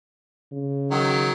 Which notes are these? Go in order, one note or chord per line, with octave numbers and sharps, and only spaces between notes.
C#3
D#3 F#3